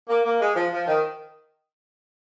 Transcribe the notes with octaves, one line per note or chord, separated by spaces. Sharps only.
A#3
A#3
G#3
F3
F3
D#3